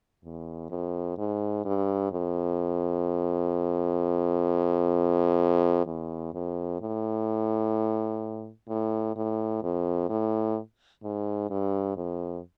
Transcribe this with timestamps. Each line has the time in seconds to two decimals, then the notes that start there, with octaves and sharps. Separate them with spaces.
0.24 E2
0.70 F2
1.18 G#2
1.65 G2
2.12 F2
5.86 E2
6.34 F2
6.81 A2
8.68 A2
9.16 A2
9.63 F2
10.09 A2
11.03 G#2
11.50 G2
11.97 F2